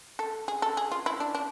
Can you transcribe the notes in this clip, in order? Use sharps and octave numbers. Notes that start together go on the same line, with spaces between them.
A4
G#4
A4
G#4
F4
E4
D4
D4